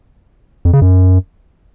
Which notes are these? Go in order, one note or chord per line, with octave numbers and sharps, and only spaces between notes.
F2
C#3
F#2